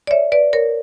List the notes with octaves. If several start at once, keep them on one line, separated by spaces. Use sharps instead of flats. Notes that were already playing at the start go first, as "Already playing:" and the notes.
D5
C#5 E5
B4 D5
A#4 C#5